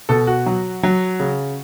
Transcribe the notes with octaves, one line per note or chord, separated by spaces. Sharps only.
B2 A4
F#4
F#3
F#3
C#3